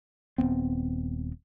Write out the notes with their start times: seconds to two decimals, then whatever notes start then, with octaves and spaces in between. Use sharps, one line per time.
0.38 D#1 B2 B3 C4